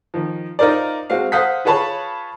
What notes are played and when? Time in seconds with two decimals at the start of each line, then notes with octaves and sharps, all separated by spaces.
0.14 D#3 F3
0.59 D#4 F4 A#4 C5 D5
1.10 G#3 C4 F#4 F5
1.32 C5 F5 F#5 D#6 G6 B6
1.65 F4 G#4 B4 C#5 A5 B5